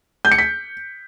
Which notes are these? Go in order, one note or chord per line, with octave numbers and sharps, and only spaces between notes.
G6
C#7
B6